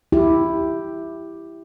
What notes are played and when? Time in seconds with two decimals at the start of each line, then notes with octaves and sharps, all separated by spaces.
0.12 E4 G4